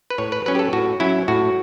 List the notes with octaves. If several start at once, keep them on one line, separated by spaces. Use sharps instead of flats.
B4
A2 C#5
B4
F#3 C#4 B4
G4
A4
A2 F#4
F#3 C#4 E4
A2 F#4